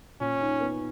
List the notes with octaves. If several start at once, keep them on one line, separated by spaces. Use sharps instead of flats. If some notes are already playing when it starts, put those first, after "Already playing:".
A#2 C#4
D#4
B3